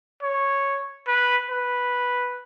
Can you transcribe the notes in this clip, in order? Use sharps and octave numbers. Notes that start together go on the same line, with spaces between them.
C#5
B4
B4